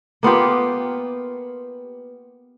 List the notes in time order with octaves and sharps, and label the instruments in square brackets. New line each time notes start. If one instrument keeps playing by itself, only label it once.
[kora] A#3 B3 F4 G4